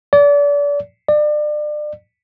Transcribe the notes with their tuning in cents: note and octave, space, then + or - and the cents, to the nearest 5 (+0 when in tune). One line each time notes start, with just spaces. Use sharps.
D5 -35
D5 +30